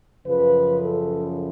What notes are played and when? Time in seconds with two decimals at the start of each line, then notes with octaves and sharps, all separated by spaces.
0.24 F#2 C#3 F3 B4
0.80 A4